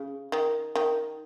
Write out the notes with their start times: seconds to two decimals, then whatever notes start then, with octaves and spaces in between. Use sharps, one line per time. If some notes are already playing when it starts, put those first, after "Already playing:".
Already playing: C#3
0.32 D#3
0.75 D#3